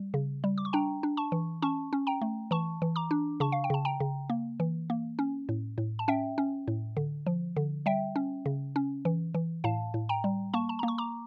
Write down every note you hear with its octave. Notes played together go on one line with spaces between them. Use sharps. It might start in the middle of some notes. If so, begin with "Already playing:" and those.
Already playing: G3
C#3
G3
D6
C#6
D4 G5 A#5
D4
A5 C#6
E3
C#4 A5 C#6
C#4
G5 A#5
A3
E3 A5 C#6
E3
A#5 D6
D4
C#3 A5 C#6
F5
G5
C#3 A5
G5 A#5
C#3
A#3
E3
A#3
C#4
A2
A2
A5
C#4 E5 G5
C#4
A2
D3
F3
D3
G3 E5 G5
C#4
C#3
C#4
E3
E3
A2 F5 A5
A2
G5 A#5
G3
A#3 A5 C#6
A5
A#3 A#5
C#6
A#5 D6